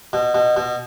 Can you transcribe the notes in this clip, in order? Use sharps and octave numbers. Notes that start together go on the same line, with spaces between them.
B2
B2
B2